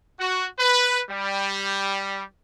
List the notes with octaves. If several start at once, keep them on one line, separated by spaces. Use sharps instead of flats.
F#4
B4
G3